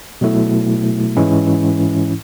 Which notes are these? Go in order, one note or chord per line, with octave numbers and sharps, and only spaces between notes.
B2 F#3 A3 E4
G#2 E3 G#3 C#4 E4